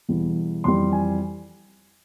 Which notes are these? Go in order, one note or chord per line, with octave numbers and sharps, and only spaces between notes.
E1 E2 E3 G3
F2 E3 G3 C6
G#5